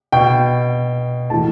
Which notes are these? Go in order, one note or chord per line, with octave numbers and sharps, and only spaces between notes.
B2 G5
A2 E3 A5